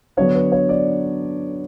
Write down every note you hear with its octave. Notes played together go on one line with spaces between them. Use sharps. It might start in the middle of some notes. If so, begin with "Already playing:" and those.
D3 F#3 B3 D4 C#5
B4
C#5
D5